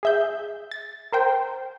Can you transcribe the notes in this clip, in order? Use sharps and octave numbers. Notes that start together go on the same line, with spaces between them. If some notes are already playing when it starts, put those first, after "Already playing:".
G#4 E5 G6
A6
A#4 C5 G5